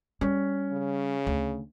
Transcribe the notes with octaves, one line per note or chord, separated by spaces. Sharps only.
G3 C#4
C#3
D2